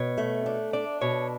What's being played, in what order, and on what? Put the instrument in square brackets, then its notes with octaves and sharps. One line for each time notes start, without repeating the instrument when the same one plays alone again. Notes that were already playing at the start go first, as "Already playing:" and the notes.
Already playing: [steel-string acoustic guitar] B2 [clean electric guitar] C#5
[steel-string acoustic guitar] A3
D4
[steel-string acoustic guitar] D4 [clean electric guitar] D5
[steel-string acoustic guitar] B2 [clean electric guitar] C#5